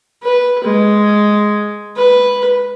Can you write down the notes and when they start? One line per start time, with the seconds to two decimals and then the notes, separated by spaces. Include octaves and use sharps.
0.23 B4
0.64 G#3
1.96 B4